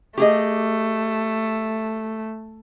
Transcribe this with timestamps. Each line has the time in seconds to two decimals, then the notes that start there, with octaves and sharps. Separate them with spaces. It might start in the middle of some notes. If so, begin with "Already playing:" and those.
0.18 A3 G4 G#4 D#5